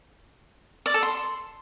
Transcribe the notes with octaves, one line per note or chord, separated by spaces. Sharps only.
D5
A4
C6